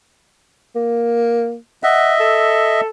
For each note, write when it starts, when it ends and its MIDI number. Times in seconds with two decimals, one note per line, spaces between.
0.76 1.57 58
1.83 2.81 75
1.83 2.81 76
1.83 2.14 78
2.20 2.90 69